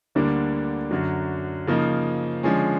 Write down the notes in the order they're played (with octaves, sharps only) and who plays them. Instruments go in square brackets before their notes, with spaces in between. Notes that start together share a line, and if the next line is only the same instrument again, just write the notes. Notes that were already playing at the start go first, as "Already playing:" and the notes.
[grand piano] D2 D3 G3 A#3 D4
F#2 D3 F#3
C#3 F3 A#3 D#4
D3 F3 G#3 C#4